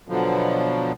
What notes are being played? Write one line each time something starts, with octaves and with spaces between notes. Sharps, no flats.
B2 D3 F3 F#3